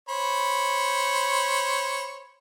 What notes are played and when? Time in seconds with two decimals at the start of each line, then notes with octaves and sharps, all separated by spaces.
0.09 C5 C#5 B5